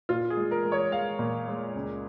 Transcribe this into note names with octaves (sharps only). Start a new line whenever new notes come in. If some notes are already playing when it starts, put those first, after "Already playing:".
A#2 F4
G#4
G#3
A#4
G#3
C#5
G#3 F5
A#2
G#3
C#2